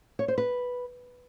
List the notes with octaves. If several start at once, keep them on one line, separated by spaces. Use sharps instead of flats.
C#5
C5
B4